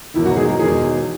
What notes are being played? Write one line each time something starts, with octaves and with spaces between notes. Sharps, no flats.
E1 E2 D#3 E4
F#3 F#4
G#3 G#4
A#3 A#4
E1 E2 D#3 G#3 G#4